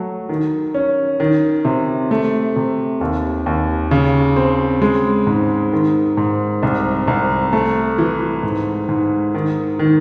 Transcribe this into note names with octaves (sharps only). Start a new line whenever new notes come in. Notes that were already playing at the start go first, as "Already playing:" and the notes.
Already playing: F#3 A3
D#3
C#4
D#3
C3
A3
C3
D#2
D#2
C#3
C4
G#3
G#2
D#3
G#2
C2
C2
A3
E3
G#2
G#2
D#3
D#3